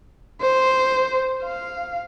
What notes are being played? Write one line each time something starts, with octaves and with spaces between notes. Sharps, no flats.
C5
F5